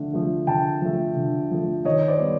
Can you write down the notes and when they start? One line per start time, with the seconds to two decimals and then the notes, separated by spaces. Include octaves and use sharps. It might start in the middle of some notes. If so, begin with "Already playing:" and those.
Already playing: D3 F3 A3
0.13 F3 A3
0.47 D3 G5 A5
0.82 F3 A3
1.17 D3
1.51 F3 A3
1.85 D#3 C#5 D#5
2.08 C5 D5
2.19 G3 B3